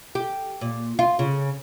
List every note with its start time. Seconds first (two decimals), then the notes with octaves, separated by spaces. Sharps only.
0.15 G4
0.61 A#2
0.99 F4
1.19 C#3